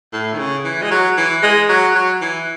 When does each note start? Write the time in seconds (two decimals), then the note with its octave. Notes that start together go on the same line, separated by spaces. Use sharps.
0.13 A2
0.34 D#3
0.38 C#3
0.64 E3
0.82 G#3
0.91 F#3
1.17 E3
1.43 G#3
1.69 F#3
1.95 F#3
2.21 E3